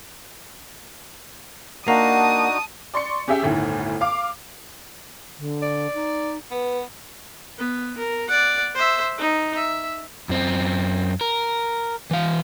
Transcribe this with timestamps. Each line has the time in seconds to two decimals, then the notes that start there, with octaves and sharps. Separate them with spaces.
1.88 A#3 D4 D#4 F#4 F#5 A5 D#6
2.94 D5 C6 C#6 C#7
3.28 C#4 G4 G#4 E5 G5
3.42 G1 D2 A2 D#3
4.01 F5 D6
5.38 D3
5.62 D5
5.94 D#4
6.51 B3 B4
7.58 B3
7.97 A#4
8.28 D5 F#5
8.75 C5 E5
9.18 D#4
9.56 E5
10.29 F#2 C4
11.21 A#4
12.11 E3 F5